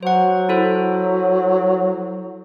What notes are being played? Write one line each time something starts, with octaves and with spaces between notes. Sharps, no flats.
F#3 C5 F#5
E4 A4 C5